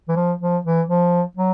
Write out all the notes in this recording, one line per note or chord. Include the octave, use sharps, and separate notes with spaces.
E3
F3
F3
E3
F3
F#3